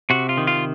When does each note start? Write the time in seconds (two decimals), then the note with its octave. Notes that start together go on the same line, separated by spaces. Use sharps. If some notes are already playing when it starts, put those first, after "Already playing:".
0.10 C3 F#4
0.29 F4
0.38 D#3
0.47 F4